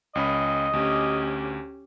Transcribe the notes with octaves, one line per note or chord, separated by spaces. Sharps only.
C#2 C#4 D#5 B5
D2 C#4 G4